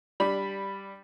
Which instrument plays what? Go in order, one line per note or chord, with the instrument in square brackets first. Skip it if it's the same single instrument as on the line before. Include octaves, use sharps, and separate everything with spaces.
[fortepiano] G3 D4 B5